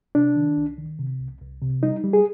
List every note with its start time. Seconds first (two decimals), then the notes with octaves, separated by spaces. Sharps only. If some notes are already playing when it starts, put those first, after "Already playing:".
0.15 C3 D4
0.36 D#3
0.57 C2
0.78 D#3
0.99 C3
1.20 C2
1.41 C2
1.62 C3
1.83 G3 D#4
2.04 G3
2.13 G#4